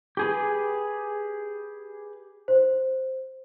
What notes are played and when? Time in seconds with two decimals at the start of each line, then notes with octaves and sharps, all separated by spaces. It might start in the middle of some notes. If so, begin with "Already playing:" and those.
0.17 G4 G#4 B4
2.48 C5